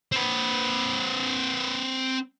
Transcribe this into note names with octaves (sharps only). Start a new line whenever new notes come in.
C4 B4